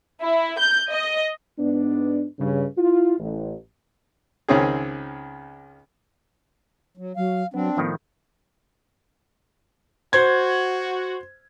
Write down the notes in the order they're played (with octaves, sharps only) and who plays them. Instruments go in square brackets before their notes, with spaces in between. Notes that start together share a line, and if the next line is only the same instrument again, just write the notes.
[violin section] E4
G6
D#5
[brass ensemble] G#2 B3 D4
G2 C#3
E4 F4
A1
[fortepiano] C#2 D#3 C4 C#4 G#4
[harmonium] F#3
[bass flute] F#3 [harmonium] F5
[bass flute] F#3 [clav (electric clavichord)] B3 [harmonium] C4 D4
[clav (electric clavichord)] A2 D#3 F3 [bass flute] B3
[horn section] F#4 [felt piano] C5 G#6